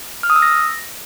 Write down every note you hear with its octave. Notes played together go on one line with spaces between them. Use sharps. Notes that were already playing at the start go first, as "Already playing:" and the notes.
F6
D#6
E6
A#6